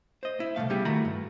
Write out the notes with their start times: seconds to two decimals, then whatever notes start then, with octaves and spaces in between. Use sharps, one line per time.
0.23 C5 D#5
0.40 E4
0.56 C2 F#2 B2 A3 F5
0.70 G3 B3 E4 G4 G#4
0.85 D#3 A3 E4 F#4 A#5 B5
1.05 G2